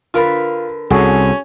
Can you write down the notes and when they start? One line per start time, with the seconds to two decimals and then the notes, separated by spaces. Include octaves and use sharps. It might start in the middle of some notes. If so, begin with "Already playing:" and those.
0.14 D3 F4 A#4 B4
0.90 C2 C#4 F#4 G#4 A4